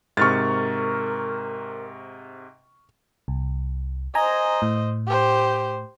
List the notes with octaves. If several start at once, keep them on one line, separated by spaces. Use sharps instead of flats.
G#2 C3 A#4 C#6 F6 A6
C2
C5 D#5 G#5 A#5
A2
G4 C5